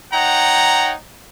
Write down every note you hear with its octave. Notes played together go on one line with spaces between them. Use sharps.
D#4 C#5 F#5 G5 A#5